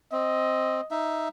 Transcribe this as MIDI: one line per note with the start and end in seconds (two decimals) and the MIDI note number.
0.12 0.81 60
0.12 0.89 75
0.91 1.28 63
0.91 1.28 76